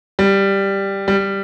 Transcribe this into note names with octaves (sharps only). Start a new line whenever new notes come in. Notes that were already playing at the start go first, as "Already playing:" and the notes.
G3
G3